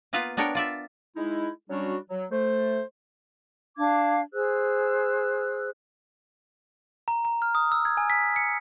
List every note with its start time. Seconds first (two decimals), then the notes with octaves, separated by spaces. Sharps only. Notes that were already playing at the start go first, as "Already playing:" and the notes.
0.13 A#3 B3 F4 B4 F5
0.37 B3 D4 A#4 C#5 G5
0.55 F4 D5 E5
1.15 G#3 D#4 E4
1.70 F#3 G3 C#4 D4 F#4
2.09 F#3
2.30 A3 C5
3.78 D4 F5 D6 G#6
4.33 G#4 C5 E6 F#6
7.08 A#5
7.25 A#5
7.42 F6
7.55 D#6
7.72 E6
7.85 G#6
7.97 G#5
8.10 B6
8.36 C#7